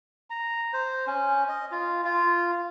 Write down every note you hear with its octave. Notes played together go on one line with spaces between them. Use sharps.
A#5
C5
C#4
D#5
F4
F4